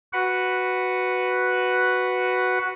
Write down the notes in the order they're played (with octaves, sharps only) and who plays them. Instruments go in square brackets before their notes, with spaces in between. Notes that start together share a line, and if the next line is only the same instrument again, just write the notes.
[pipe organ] F#4 B4 F#5